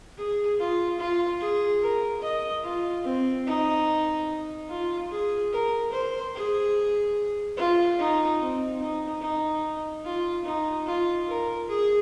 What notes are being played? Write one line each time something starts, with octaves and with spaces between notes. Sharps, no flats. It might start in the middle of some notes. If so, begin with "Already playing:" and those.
G#4
F4
F4
G#4
A#4
D#5
F4
C4
D#4
F4
G#4
A#4
C5
G#4
F4
D#4
C4
D#4
D#4
F4
D#4
F4
A#4
G#4